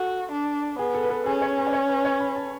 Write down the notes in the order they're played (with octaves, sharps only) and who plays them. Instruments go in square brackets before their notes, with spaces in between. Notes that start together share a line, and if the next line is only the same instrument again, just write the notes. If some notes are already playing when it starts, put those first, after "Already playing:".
Already playing: [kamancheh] F#4 [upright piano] A4
[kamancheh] D4
[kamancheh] B3 [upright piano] G#4
[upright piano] A4
B4
A4
[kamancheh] C#4 [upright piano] G#4
[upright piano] C#5
B4
D5
C#5
B4
C#5
B5
A5